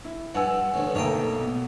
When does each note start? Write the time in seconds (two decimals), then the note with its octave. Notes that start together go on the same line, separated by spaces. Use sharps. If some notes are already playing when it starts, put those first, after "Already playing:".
0.05 E4
0.35 G2 F#5 G#5 E6
0.74 A1 D2
0.95 B1 A3 A#3 C#5 D#5 G5
1.40 B2